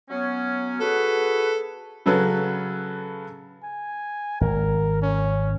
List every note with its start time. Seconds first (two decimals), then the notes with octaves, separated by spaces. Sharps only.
0.10 F#3 B3 C#4
0.80 F#4 G#4 A4 B4
2.06 C#3 F#3 A4 B4
3.64 G#5
4.41 G#1 A#4
5.02 C#4